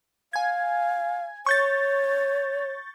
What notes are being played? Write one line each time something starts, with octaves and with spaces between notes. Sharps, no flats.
F5 G#5 G#6
C#5 C#6 G6 A6